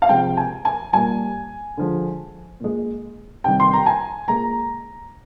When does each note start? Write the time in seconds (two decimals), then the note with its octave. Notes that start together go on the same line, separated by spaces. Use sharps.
0.02 F5
0.09 C3 F3 G#3 G5
0.37 G#5
0.65 G#5
0.93 A#2 G3 G#5
1.77 D3 F3 G#3
2.60 A#2 G#3
3.44 C3 D#3 G3 G5
3.60 C6
3.73 A#5
3.86 G#5
4.28 A#2 G#3 A#5